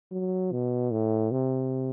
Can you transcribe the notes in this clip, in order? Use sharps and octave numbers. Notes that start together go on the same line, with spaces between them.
F#3
B2
A2
C3